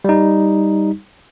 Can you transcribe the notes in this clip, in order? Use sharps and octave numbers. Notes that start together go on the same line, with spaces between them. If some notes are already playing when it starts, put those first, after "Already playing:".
G3 D#4